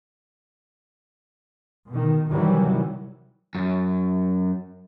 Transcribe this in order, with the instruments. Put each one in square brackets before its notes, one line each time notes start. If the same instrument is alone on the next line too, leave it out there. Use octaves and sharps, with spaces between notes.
[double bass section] B2 D#3
C3 D#3 E3 F#3 G3
[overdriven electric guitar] F#2